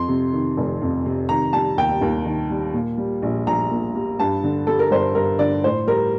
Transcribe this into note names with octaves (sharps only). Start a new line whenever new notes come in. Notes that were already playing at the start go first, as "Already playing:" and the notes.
Already playing: F2 C6
C3
D#3
F1
F2
C3
D#3 A#5
G3 A5
D#2 G5
D#2
D#3
G3
A#2
G3
A#1
A#1 A#5
A#2
G3
G2 A5
D3
G3 A4
A#4
G1 C5
G2 A#4
D3 D5
A2 C5
G3 A#4